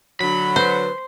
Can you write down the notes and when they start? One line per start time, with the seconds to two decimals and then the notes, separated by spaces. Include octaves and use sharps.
0.21 D3 F#3 B5
0.56 B4 C5